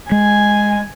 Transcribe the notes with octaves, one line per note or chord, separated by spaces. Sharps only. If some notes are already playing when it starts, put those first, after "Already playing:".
G#3 G#5